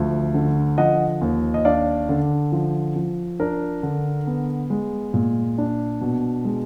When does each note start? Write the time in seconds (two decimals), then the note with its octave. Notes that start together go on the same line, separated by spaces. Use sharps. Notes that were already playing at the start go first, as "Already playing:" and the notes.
Already playing: D2 F3
0.34 D3
0.78 F3 D#5 F#5
1.21 D#2
1.54 D#5
1.65 D4 D5 F5
2.09 D3
2.52 F3
2.96 F3
3.39 D4 A#4
3.83 D3
4.27 B3
4.70 G#3
5.14 A#2
5.58 D4
6.01 B2
6.45 G#3